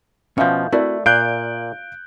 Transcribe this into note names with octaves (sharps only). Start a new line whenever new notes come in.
B2 F3 C#4 E5 F5 G5 G6
A3 C4 E4 F#4 A#4 D5 E5
A#2 F5 F#6 G6 D7